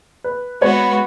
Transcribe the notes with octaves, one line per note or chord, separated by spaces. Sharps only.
B4
G#3 B3 F#4 B4 C#5 B5